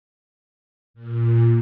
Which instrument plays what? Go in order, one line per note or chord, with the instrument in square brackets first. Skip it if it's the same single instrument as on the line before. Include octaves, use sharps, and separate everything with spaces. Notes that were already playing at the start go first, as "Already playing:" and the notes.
[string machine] A#2